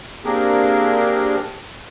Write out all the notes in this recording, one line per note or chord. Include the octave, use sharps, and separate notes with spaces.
A#3 C4 D4 G4 G#4 A#4